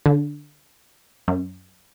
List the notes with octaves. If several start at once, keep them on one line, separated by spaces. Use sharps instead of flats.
D3
F#2